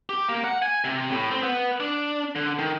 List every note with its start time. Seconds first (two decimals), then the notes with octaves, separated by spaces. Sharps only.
0.09 G4
0.29 A#3
0.44 F#5
0.62 G#5
0.84 C3
1.10 A2
1.31 C4
1.43 B3
1.80 D4
2.36 D3
2.59 D#3